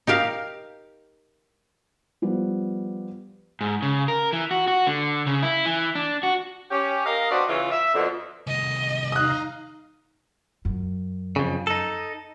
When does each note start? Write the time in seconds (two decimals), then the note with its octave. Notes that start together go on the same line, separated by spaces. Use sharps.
0.07 D#4 G4 A#4 F5
2.22 F3 G3 B3
3.61 G#2
3.82 C#3
4.08 A#4
4.33 E3
4.51 F#4
4.68 F#4
4.87 D3
5.27 C#3
5.43 E4
5.66 E3
5.95 D4
6.23 F#4
6.71 C#4 G4
7.05 A#4 D#5 F5
7.30 B3 C4 D4 F#4 D5 D#5
7.49 C#3 E3 F4
7.70 E5
7.94 F2 B2 D3
8.47 C2 D#3 D#5
9.12 D#4 F5 A#5 D#6 F#6
10.65 F#2
11.36 F2 C#3
11.67 D#4 A4